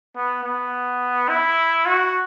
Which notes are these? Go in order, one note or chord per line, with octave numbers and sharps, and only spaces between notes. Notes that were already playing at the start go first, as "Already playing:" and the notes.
B3
B3
E4
F#4